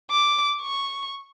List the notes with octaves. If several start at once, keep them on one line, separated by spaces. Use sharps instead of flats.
D6
C#6